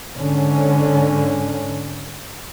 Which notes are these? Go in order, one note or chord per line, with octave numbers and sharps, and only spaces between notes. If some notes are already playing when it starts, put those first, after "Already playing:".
G#2 D3 C#4